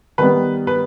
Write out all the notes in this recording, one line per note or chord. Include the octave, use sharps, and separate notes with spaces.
D#3 G3 B3 B4
B4